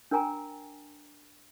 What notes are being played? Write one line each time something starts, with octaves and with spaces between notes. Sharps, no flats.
D4 A#4 G5 G#5 A#5